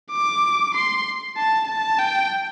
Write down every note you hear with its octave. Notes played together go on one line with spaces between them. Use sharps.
D6
C6
A5
A5
G5